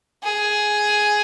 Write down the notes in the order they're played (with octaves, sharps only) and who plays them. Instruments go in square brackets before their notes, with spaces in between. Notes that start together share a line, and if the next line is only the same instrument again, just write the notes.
[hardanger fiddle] G#4